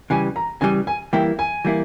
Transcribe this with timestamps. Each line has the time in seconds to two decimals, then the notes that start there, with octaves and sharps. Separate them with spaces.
0.10 C#3 E3 G3 G#5
0.36 A#5
0.61 C#3 E3 G3 G#5
0.87 G#5
1.13 E3 G3 A#3 E4 G5
1.39 G#5
1.65 E3 G3 A#3 E4